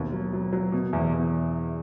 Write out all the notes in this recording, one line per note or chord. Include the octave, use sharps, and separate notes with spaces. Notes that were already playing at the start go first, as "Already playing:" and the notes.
Already playing: D#2 B2
F#3
F#3
F#3
B2
E2
E2